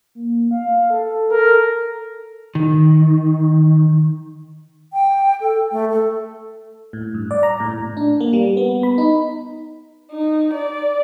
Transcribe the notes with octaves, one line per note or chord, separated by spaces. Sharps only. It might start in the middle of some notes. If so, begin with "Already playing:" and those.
A#3
F5
A4
A#4
D#3
G5
A4
A3
A4
A2
G2
D5
A#5
A2
A2
D4
A#3
G3
B3
B5
D#4
D#4
D5